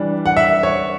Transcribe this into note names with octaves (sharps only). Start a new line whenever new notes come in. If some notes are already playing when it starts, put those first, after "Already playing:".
Already playing: E3 G3 D4
F#5
E5
C#5